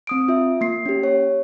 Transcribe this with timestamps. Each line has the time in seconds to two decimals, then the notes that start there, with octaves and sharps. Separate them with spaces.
0.07 C4 D#6 D7
0.28 F4 E5
0.61 A#3 C7
0.86 C#4 G4
1.03 C#5